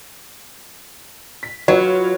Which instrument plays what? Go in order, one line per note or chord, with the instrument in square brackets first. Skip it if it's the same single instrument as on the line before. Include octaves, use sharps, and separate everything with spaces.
[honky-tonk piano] B6
[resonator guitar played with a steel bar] F#3 [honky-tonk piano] F4 B4 C#5